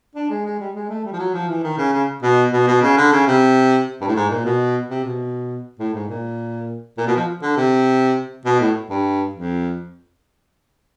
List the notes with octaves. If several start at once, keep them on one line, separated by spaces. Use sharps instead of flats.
D4
G#3
G#3
G3
G#3
A3
G3
F3
F#3
F3
E3
D#3
C#3
C#3
B2
B2
B2
C#3
D3
C#3
C3
G2
A2
G#2
A#2
B2
C3
B2
A2
G#2
A#2
A#2
B2
F3
D3
C3
B2
A2
G2
F2